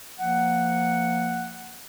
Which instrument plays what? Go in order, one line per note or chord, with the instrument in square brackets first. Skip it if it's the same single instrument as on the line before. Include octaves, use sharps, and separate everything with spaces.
[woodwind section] F3 A#3 F#5